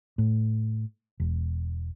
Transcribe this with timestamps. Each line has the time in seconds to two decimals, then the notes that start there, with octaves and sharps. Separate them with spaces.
0.18 A2
1.20 E1